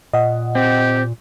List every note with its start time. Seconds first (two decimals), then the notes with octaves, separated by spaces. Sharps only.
0.14 A#2 D#5 F#5
0.55 C4 G4